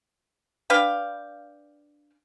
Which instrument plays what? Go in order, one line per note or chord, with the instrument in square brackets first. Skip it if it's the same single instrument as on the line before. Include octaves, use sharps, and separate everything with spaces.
[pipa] D4 B4 F5 G5